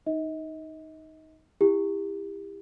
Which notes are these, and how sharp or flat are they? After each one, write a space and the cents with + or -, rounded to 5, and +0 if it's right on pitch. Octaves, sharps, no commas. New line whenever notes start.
D#4 +0 D#5 +40
E4 +0 G4 +30